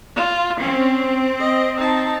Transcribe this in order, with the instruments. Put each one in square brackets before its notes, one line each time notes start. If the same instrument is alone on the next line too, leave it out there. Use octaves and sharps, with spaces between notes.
[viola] F4
[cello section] C4 [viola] C#4
[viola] D#5
D#4 A5